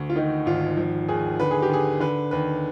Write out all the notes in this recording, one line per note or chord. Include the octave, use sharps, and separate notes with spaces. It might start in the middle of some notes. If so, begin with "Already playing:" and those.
Already playing: D2
F4
D#3 D#4
G#1 F4
F3
D#2 G#4
D3 B4
G#4
G4
D3 G#4
D3 B4
D#2 B4